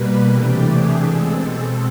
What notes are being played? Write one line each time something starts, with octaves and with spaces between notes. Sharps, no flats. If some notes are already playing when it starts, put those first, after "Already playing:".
Already playing: B2 G3 A#3 B4
C3 E3 A3 D4 G4
G#4
B2 G#3 C4 A4